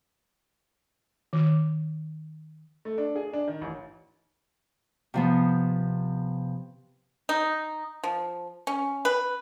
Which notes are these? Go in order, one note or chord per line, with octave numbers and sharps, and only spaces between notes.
D#3
A3
D4
G#4
D4
D#3
A1
C3 F3 B3
D#4
F3
C#4
B4